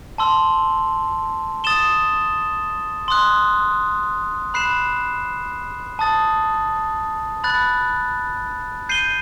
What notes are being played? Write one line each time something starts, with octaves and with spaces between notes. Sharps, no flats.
A5 C6 E6
D#6 A6 E7 G7
C6 D#6 F#6
B5 F#6 C7 E7
A5 D#6 A6
B5 F#6 A6
G6 C7 D#7 G7